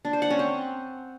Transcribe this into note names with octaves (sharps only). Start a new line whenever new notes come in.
D4
C5
F#5
C#4
C4